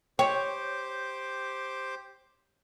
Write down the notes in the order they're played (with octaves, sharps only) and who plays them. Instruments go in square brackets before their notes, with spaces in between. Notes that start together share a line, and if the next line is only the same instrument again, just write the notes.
[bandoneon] G4 C5 D6 [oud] C#5 [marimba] G5